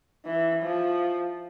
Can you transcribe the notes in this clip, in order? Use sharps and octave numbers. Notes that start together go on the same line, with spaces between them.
E3
F3